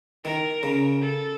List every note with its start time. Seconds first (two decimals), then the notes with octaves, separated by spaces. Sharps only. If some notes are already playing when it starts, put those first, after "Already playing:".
0.25 D#3 A#4
0.63 C#3
1.02 A4